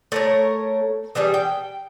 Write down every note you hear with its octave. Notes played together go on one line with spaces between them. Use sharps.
A3 A#4 C#5
E3 G3 D4 G#4
G5